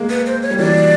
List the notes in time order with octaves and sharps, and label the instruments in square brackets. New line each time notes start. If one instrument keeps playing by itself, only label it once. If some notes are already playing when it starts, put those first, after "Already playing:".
Already playing: [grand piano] G#3 A#3
[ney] B4
C5
C#5
[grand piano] G3
[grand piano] E3 F#3 [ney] D5